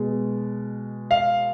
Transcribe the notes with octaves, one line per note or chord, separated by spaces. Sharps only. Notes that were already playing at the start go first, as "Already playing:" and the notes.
Already playing: B2 G#3
F5